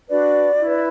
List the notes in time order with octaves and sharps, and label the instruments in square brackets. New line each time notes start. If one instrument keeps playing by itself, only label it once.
[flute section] D4 F#4 B4 D5
E4
B4